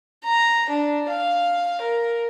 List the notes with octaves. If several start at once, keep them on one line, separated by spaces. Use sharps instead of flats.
A#5
D4
F5
A#4